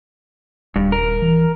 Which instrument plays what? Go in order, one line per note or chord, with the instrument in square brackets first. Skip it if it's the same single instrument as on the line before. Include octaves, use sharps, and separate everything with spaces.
[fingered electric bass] D#1 [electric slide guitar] G2
[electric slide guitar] A#4
[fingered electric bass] E3